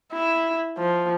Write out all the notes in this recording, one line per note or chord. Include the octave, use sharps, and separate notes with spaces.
E4
F3